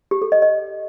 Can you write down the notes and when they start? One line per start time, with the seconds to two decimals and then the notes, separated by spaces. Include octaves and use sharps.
0.11 G4
0.22 A4
0.32 D#5
0.42 D#5